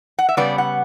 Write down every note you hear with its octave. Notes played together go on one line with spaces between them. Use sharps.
F#5
E5
C#3 G3 B3 D5
F#5